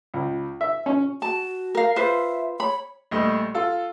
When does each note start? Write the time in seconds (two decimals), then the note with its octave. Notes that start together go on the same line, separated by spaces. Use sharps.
0.14 C#2
0.61 E5
0.86 C#4
1.22 F#4 A5
1.75 A#4 F5
1.96 F4 B4 C5 E5
2.60 C#5 B5
3.11 A#1 G3 A3 D#5
3.55 F4 A4